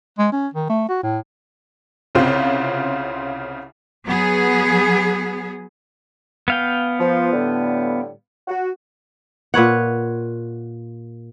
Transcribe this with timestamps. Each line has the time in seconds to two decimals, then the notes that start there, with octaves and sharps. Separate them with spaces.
0.19 G#3
0.32 C#4
0.54 D#3
0.69 A3
0.89 F#4
1.03 A2
2.15 C2 C#3 C4 F4
4.05 F#3 B3 G#4
6.48 B3 F5 G5
7.00 F3
7.33 A2 D3 G3
8.48 F#4
9.54 A#2 B4 C#5 F#5